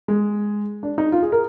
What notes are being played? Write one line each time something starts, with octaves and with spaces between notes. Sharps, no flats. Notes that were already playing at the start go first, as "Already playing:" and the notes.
G#3
D4
D#4
F4
G#4
A#4